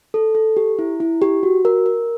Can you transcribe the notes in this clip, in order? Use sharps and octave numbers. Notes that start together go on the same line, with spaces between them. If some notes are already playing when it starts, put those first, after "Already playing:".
A4
A4
G4
E4
E4
G4
F#4
A#4
A#4